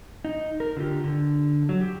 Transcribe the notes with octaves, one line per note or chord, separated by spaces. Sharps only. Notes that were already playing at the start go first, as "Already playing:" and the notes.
D#4
A#4
D3 F4 G4
D3
F#3
G4